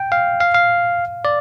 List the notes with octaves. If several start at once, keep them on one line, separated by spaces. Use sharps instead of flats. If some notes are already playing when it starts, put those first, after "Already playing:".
Already playing: G5
F5
F5
F5
D5